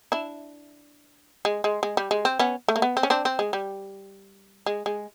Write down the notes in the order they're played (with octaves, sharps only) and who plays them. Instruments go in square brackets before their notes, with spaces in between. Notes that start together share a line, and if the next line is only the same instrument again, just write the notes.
[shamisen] D4 E4
G#3
G#3
G#3
G3
G#3
C4
B3 C#4
A3
A#3
B3
C4
C#4
C4 D4
C4
G#3
G3
G#3
G#3